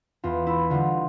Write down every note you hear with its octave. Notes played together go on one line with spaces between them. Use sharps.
E2 F4
E4
D3 G3 F4